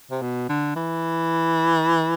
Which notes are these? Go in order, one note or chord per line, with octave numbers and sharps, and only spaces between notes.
C3
B2
D3
E3